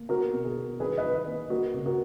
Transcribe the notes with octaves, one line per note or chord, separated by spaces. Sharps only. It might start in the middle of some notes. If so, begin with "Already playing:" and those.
Already playing: A#3
B3 F#4 A#4
B2
G#4
B2
D#3 G#4 B4
B4 D#5
D#3
B4 D#5
A#3
A#3 F#4 A#4
C#3
F#4 A#4